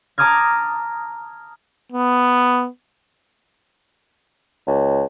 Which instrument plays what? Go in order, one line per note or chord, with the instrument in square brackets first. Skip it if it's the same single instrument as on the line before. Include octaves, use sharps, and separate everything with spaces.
[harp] A5 A#5 D6 D#6 F6 G#6
[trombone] B3
[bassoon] C#2